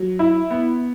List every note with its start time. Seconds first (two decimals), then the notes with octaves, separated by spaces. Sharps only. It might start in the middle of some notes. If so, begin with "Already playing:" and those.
Already playing: F#3
0.19 E4
0.50 B3